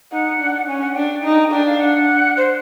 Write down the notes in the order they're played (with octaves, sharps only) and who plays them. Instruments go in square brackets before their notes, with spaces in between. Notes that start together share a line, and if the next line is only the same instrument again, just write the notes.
[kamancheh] D#4 [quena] F#5
[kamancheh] D4
[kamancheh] C#4 [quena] G#5
[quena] F#5
[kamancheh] D4 [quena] G5
[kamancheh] D#4
[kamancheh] D4 [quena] G5
[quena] F5
F#5
[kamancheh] D4
[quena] C5